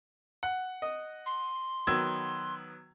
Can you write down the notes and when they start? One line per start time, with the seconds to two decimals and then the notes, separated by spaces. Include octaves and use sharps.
0.43 F#5
0.82 D#5
1.26 C6
1.87 D#3 F#3 B3 E6 G#6